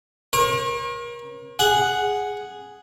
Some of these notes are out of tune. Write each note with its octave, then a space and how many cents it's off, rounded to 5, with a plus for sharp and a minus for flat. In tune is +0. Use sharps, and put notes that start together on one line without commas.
A#4 +35 C#5 -45
G#4 +0 F#5 +0